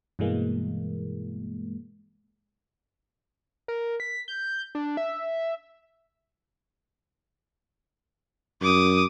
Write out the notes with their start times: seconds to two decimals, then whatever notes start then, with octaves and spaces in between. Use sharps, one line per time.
0.19 G2 B2 E3 G#3 A#3
3.68 A#4
4.00 B6
4.28 G6
4.75 D4
4.97 E5
8.62 F#2 D6 D#6